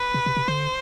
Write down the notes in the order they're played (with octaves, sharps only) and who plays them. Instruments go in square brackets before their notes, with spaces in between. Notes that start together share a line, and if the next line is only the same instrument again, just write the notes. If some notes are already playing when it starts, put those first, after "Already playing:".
Already playing: [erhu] B4
[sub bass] C3
C3
C3
[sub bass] D3 [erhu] C5